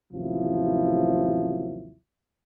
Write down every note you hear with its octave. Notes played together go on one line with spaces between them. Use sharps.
A1 D#2 C3 F3 F#3 E4